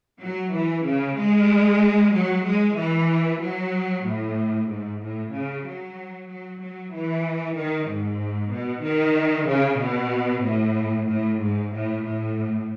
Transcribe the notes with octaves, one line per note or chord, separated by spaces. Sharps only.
F#3
E3
C#3
G#3
F#3
G#3
E3
F#3
A2
G#2
A2
C#3
F#3
F#3
F#3
E3
D#3
G#2
B2
D#3
C#3
B2
A2
A2
G#2
A2
A2